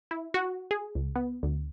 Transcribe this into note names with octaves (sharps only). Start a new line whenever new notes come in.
E4
F#4
G#4
C#2
B3
D2